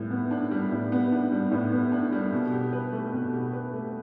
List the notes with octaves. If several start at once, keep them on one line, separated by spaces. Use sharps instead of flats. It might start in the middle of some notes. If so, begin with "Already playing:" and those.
Already playing: A2 G3 B3
B3
D4
G3
A2
B3
D4
G3
A2
B3
D4
G3
B2
G4
B4
A3
B2
G4
B4
A3